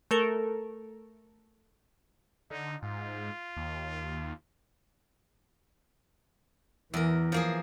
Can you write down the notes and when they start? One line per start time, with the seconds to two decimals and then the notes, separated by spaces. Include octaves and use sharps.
0.11 A3 A4 A#4
2.51 D3 D#4
2.82 G#2 F4
3.56 D#2
6.94 E2 E3 A#4
7.32 F3 A#3 G#4